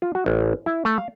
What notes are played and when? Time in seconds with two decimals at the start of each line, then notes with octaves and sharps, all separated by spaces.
0.02 F4
0.15 F#4
0.26 A1
0.66 E4
0.85 A3
0.98 F5